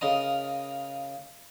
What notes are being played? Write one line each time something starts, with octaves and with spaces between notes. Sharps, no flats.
C#3 A#4 D#5 F5 A#5 D#6